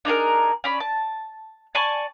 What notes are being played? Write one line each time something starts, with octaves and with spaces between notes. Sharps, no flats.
D4 D#4 G#4 A#4
C#4 D5 B5
A5
D5 G#5 A5 C#6